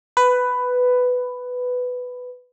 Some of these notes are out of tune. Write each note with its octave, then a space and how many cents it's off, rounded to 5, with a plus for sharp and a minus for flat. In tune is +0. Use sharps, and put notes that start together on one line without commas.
B4 +10